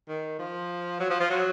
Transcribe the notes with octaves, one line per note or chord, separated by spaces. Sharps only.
D#3
F3
F#3
F3
F3
F#3